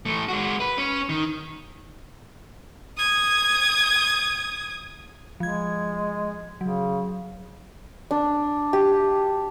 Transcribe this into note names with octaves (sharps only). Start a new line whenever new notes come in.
E3 A3
G#3 F#4
B4
C#4
D#3
D#6 G#6
F3 G#3 G#6
C#3 F#3
D4
G4